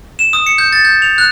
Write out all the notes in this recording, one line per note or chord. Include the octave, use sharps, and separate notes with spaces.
E7
D#6
C#7
G6
A6
G6
F7
F#6